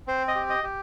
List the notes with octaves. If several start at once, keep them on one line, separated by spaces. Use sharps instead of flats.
C4 C5
D#5
G4
D#5
G4